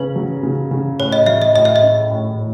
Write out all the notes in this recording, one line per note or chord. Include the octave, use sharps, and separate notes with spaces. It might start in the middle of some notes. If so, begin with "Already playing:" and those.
Already playing: C#3 C#4 B4
F#3
C#3
C#3
A2 C#5
D#5
F#3 E5
D#5
A2 D#5
E5
D#5
C#4
A2
A2